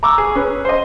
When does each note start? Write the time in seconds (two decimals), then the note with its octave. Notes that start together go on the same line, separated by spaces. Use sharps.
0.03 A#5 C#6 D6 E6
0.18 G#4
0.35 C#4 B4
0.65 C5 D#5